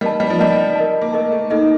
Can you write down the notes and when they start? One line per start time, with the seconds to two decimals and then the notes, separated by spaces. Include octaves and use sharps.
0.01 G3 A#4 D#5 A5
0.20 G3
0.30 F3
0.38 G3 A#4 D#5 A5
0.76 A#4 D#5 A5
1.02 A#3
1.12 A3 A#4 D#5 A5
1.32 A3
1.50 A#3 D#4 A4 D#5